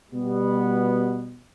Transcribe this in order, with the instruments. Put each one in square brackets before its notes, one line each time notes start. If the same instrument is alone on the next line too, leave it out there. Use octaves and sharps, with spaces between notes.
[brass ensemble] B2 G3 B3